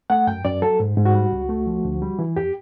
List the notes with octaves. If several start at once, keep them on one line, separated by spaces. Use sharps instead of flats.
A3 F#5
F#2 G5
F#2 D5
F#3 A4
G#2
G#2
F#4
G3
C#2
A3
F3
D2
G3
E3
F2 G4